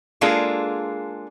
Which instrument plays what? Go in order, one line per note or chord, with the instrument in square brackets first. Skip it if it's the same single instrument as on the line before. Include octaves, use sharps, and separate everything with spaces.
[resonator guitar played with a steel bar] G#3 A#3 D4 F4 G#4 A4